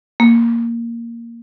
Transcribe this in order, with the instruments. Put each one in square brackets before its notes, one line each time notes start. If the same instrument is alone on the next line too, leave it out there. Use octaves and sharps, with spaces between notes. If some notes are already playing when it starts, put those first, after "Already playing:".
[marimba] A#3